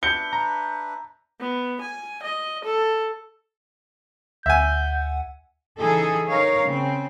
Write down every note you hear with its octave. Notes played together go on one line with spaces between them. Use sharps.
D4 B4 E5 G6 C#7 G7
A#5
B3
G#5
D#5
A4
D2 E5 F#5 G#5 G6
C#3 E3 D#4 G#4 A4
D#4 A#4 C#5 F5
C#3 C4